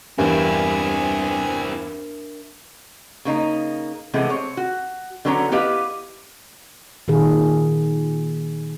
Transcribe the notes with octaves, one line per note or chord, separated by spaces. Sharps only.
E2 G2 C4 D4 E4 A#4 E5 G#5
C#3 A#3 D#4
C3 E3 G#3 A3 B3
C4 C#5
F#4
D3 F#3 B3 C#4 A#5
B3 E4 G4 B4 D#5 F5
A#2 D#3 G#4